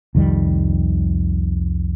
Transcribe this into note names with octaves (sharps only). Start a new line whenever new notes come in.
C2 F2 D#3 G3